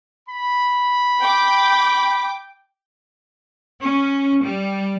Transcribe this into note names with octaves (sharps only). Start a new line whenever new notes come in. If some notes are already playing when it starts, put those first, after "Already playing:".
B5
G5 D6
C#4
G3